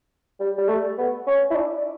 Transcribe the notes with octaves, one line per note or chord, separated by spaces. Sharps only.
G3
G3
A3
B3
C#4
E4
D4